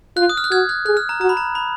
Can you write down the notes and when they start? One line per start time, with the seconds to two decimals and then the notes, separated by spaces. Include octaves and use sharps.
0.17 F4 F#6
0.29 D#6
0.37 F6
0.44 F#6
0.51 F#4 F6 G#6
0.69 F#6
0.86 G#4 F#6
0.97 F6
1.09 A#5
1.20 F#4 A#5
1.29 B5
1.37 A#5
1.55 B5